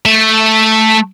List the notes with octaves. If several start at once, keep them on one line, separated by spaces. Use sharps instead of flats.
A3 E5